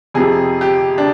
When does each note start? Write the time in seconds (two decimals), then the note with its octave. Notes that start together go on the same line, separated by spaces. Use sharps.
0.14 F2 C3 F3 G#4
0.61 G4
0.98 D4